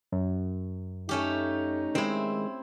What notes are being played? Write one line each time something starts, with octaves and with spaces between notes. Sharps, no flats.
F#2
A3 C#4 D#4 G4
D#3 G#3 C4 E4